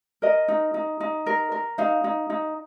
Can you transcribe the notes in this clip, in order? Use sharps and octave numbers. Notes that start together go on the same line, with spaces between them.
A#4 D#5
D#4
D#4
D#4
A#4
A#4
D#4 F5
D#4
D#4